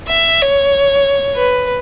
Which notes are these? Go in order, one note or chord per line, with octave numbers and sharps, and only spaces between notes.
E5
C#5
B4